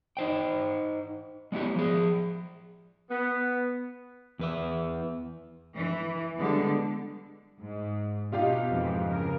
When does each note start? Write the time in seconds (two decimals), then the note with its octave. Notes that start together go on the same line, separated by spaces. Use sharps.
0.17 D#4 C5 G5
1.52 G#3 B3 E4 G4
1.76 F3 G#4
3.10 B3
4.39 E2 B4 E5
5.76 E3
6.38 D3 G3 G#3 B3
7.59 G#2
8.32 B2 D#4 F4 G4 F5
8.71 F2 G#2 E3
9.07 C#3 A#4